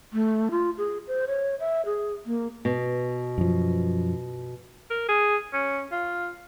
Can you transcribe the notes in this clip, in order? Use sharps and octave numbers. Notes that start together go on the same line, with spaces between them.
A3
F4
G#4
C5
C#5
E5
G#4
A#3
B2
F#2 F3
A#4
G#4
C#4
F4